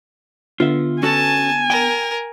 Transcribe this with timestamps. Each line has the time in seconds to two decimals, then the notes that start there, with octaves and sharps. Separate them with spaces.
0.60 D3 B3 F4 E5
1.03 C#4 F#4 A4 G#5 A5
1.70 A#4 G5